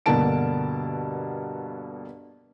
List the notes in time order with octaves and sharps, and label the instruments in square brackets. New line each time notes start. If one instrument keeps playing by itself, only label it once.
[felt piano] G2 B2 D3 A#3 A5 D7